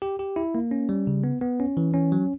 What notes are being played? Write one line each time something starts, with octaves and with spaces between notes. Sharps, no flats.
G4
G4
E4
A#3
C#4
G3
C#3
B3
B3
C#4
E3
C#4
F#3